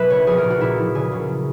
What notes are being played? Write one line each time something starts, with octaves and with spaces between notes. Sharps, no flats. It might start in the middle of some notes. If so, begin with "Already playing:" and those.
Already playing: B1 B2 B4 E5
F#1 C#5
A#1 G#4
A#4
A#2
F#4
A#2 E4
A#1
C#3 G#4
F#2